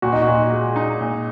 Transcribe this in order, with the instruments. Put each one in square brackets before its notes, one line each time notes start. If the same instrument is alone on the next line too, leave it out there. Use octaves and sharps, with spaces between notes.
[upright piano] A#2 [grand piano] F#4
[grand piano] D#4
F#4
[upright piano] A#2
G#3
D#4
A#2